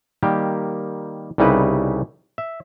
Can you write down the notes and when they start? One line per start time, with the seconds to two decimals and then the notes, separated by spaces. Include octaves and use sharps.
0.23 D#3 G3 A#3 G4
1.38 C2 C#3 G3 D#4 E4 B4
2.38 E5